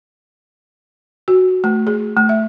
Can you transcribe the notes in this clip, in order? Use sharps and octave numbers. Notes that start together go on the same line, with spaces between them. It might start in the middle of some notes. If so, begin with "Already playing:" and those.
F#4
A3
G#4
A3
E5